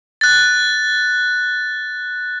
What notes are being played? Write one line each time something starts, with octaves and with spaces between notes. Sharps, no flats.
F#6 A6